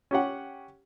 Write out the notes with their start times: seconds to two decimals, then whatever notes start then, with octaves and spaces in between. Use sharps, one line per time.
0.11 C#4 G4 F#5